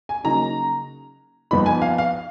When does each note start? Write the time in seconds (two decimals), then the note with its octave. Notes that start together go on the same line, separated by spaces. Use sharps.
0.09 G#5
0.24 C#3 F#3 A#3 D#4 A#5
1.51 F2 F3 B3 D#4 B5
1.66 G#5
1.82 F5
1.98 F5